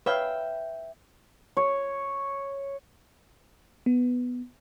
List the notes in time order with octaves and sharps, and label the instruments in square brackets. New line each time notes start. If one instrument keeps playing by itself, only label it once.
[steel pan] B4 C#5 F5 [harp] E5 G5
[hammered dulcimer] C#5
[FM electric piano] B3